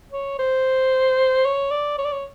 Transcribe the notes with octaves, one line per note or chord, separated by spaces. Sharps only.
C#5
C5
C#5
D5
C#5
D5
C#5